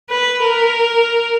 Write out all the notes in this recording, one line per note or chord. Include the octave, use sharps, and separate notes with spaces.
B4
A#4